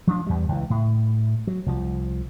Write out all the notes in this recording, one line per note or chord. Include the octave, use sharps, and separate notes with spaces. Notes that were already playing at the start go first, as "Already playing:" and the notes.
F3 D4
E2 G3
C#2 E3
A2
F#3
C2 F3